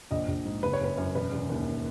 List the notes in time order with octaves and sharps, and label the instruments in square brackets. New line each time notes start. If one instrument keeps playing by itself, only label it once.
[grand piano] A#1 D#5
A#1
G#2
F#1 B4
C#5
F#1 B4
F#2
E1 B4
E1
D#2